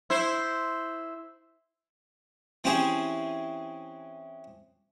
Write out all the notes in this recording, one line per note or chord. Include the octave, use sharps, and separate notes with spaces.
E4 C5
E3 C4 C#4 G4 G#4